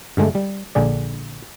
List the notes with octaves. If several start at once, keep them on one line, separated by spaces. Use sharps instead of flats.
G2 D3 G#3 A3
G3
A#1 D3 G#4 D5